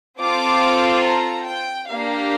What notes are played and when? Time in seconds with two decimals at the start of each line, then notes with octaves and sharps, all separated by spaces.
0.20 C4 F4 A4 D6
1.06 A#5
1.47 G5
1.90 A#3 D4 G4 F5